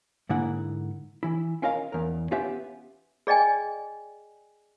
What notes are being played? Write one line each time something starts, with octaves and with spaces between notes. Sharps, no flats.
G#2 D3 A#3 E4 F#5
E3 E4
C#4 F4 A#4 D#5 F5 A#5
E2 A#4
B3 C#4 F4 G4 B4 E5
G#4 D5 D#5 G5 G#5